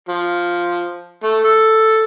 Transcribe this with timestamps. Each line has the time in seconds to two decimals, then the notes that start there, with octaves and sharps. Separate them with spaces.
0.09 F3
1.23 A3
1.45 A4